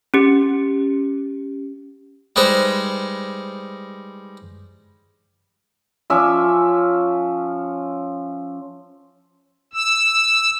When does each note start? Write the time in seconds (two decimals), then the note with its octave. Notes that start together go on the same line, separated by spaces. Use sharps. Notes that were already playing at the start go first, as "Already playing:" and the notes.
0.14 C#4 G4
2.36 G3 G#3 D#4 B4 C5
6.10 F3 C#4 E5 D6
9.74 E6